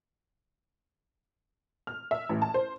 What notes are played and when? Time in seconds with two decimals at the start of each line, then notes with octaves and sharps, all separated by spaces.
1.87 F6
2.11 E5
2.29 A1
2.42 A5
2.54 C5